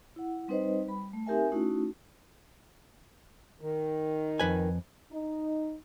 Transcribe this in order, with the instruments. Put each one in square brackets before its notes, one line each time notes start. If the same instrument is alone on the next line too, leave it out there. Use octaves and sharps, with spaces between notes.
[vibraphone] E4 F#5
G3 C4 D#4 B4 C5 D#5
G3 B5
A3
C4 D#4 G4 A#4 E5 G#5
A3 C#4 D#4 E4 F#4
[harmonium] D#3
[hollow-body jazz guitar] F2 B4 G#5
[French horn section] D#4